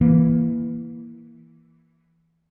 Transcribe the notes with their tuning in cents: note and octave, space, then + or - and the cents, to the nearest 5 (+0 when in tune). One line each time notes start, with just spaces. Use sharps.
E3 +0 A#3 +10